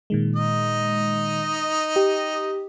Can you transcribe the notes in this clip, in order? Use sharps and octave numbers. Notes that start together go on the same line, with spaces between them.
A#2 D#3 G#3
D#4 D#5
G4